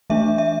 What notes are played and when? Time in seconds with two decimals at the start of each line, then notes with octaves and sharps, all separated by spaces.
0.10 E3 A3 D4 E5
0.38 E5